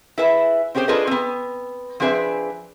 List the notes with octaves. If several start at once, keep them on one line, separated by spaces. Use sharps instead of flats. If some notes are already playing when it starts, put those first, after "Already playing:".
E4 G#4 B4 E5
C4 C#4 G4 G#4 C5
D4 F4 G#4 A4 B4 D#5
B3 C4
F3 C4 D4 G#4 B4 E5